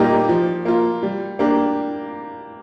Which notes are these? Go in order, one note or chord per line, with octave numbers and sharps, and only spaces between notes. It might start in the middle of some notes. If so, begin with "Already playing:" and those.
Already playing: A#2 G3 A#3 D#4 G4
F3
A#3 F4
G3
A#3 D4 G4